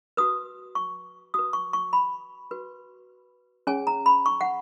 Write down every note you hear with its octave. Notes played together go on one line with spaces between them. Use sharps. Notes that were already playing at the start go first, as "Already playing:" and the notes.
F#4 B4 D#6
C#6
F#4 B4 D#6
C#6
C#6
B5
F#4 B4
C#4 G#4 C#5 G#5
A#5
B5
C#6
F#5